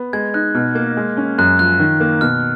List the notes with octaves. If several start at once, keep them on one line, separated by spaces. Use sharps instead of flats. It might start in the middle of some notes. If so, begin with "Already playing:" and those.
Already playing: B3
G#3 G#6
D#4 F#6
B2 F6
A#3 G#6
G#3
C#4
F#2 F#6
F3 F#6
D#3
A#3
B2 F6